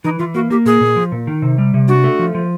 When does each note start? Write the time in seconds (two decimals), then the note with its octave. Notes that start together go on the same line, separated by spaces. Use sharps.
0.04 E3 D#4
0.19 E3 F4
0.35 A#3 F#4
0.50 A#3 G4
0.65 A#2 G#4
0.81 A#2
0.96 F3
1.12 A#2
1.27 D#3
1.42 C3
1.58 G3
1.74 C3
1.88 D4 F#4
2.04 A3
2.19 F3
2.35 F3